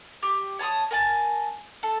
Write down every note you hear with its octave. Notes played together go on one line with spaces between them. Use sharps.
G4
C#5 A5 B5 D#6
A#4 G#5 A5
A4